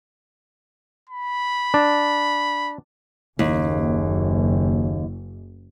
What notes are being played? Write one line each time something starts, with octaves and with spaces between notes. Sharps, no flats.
B5
D4
F#1 D#2